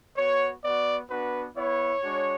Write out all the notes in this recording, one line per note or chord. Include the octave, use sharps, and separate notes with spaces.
B3 F#4 C#5
B3 F#4 D5
B3 D4 F#4 B4
B3 E4 C#5
G#3 D4 F#4